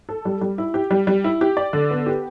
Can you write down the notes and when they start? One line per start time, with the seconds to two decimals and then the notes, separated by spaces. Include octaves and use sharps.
0.09 A4
0.25 G3
0.41 G3
0.58 E4
0.74 G4
0.91 G3
1.07 G3
1.24 E4
1.41 G4
1.57 D5
1.73 D3
1.91 B3
2.06 G4